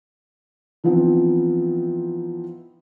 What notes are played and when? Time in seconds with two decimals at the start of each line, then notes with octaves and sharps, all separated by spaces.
0.84 E3 F3 B3 C4 D#4 E4